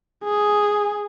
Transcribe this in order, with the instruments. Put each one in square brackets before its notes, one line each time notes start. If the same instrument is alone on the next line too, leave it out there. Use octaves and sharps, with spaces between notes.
[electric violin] G#4